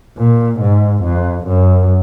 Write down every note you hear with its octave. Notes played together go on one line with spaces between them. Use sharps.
A#2
G#2
F2
F#2